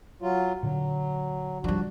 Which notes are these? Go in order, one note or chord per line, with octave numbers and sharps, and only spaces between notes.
F#3 F4
A#2 D3 F#3
F3 G3 D4 F#4